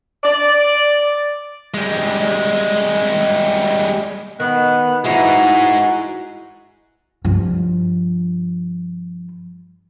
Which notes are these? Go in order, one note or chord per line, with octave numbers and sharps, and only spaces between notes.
D5
G3 G#3
D#3 B3 F#6
E3 G#3 D#4 E4 F#4
G2 F3